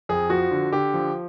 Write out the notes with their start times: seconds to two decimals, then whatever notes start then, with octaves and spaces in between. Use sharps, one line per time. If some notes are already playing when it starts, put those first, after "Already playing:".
0.09 F2 G#4
0.30 F3 F#4
0.51 D3
0.72 D3 G4
0.94 F3